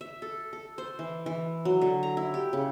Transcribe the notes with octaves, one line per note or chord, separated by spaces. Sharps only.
E5
A4
A4
C5
E3
E3
F#3
D3
A#5
E4
G4
C#3